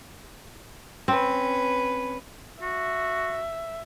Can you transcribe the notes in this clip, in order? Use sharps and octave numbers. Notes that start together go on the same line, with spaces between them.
C4 C#4 B4
F#4 E5